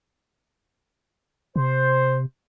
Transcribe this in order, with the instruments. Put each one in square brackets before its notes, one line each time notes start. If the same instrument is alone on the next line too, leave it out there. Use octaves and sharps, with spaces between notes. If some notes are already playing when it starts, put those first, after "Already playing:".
[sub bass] C3 [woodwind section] C5